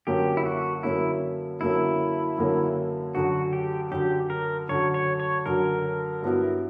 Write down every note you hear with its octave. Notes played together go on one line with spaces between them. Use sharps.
F#2 D3 A#3 C#4 G4
E4
F#4
F#2 D3 A#3 C#4 E4
F#2 D3 A#3 C#4 E4
F#2 D3 A#3 C#4
F#2 D3 F#3 F#4
G4
F#2 D3 F#3 G4
A#4
F#2 D3 F#3 C#5
C#5
C#5
F#2 D3 F#3 A#4
G2 F#3 B3 E4